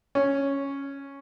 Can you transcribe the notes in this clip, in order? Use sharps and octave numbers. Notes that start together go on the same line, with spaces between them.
C#4